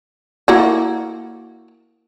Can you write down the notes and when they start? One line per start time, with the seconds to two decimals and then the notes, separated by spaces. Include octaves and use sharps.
0.48 A#3 E4 F#4